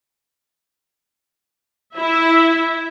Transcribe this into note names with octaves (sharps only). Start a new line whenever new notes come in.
E4 E5